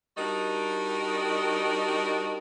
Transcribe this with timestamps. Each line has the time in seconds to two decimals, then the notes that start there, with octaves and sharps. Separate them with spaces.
0.17 G3 D4 D#4 F#4 A#4 D#5